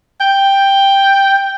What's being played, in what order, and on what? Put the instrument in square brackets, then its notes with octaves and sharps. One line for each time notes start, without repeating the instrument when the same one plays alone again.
[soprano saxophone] G5